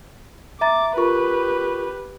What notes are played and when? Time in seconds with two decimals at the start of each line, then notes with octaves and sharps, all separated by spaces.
0.61 E5 A#5 D6 A6
0.97 F4 G4 A#4 B4 C#6